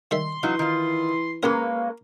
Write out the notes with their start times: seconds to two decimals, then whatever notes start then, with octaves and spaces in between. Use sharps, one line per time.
0.11 D#3 G3 E5 C6
0.43 E3 F#3 D#4 F#4 F5
0.59 D#3 F4
1.43 G#3 A#3 C#4 G4 A#4 B4